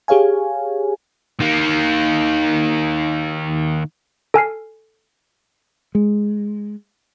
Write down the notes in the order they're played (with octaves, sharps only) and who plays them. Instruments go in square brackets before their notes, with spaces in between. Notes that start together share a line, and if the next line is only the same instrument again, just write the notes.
[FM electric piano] G4 G#4 C#5 F5 G#5
[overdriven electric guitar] D#3 A#3
[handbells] A4 G#5 F6 C7
[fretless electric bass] G#3